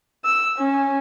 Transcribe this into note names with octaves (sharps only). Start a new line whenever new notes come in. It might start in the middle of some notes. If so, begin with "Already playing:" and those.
E6
C#4